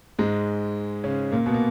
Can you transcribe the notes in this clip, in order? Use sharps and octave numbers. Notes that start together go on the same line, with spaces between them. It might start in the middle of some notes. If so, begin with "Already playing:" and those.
G#2 G#3
C#3 C#4
A#2 A#3
B2 B3
A#3